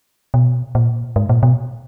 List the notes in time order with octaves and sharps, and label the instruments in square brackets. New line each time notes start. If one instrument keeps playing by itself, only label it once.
[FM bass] B2
A#2
G#2
A#2
B2